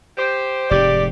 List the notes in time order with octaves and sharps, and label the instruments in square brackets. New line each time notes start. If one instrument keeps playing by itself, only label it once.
[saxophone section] G4 C5
[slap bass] F1 G#2 [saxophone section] G4 [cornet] D5